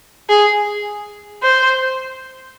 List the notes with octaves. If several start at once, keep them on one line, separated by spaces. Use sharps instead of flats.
G#4
C5